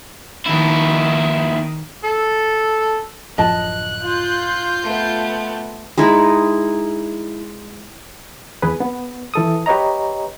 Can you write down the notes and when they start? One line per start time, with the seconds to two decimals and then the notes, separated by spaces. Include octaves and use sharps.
0.46 D#2 D#3 E4
2.04 A4
3.38 D1 F#2 F3 D#5 A5 F#6
4.03 F4 G6
4.83 A3 B3
5.98 G#3 D#4 E4
8.62 E2 G#4 B4
8.80 B3
9.34 E3 A4 D#6
9.66 G4 B4 C#5 D#5 A#5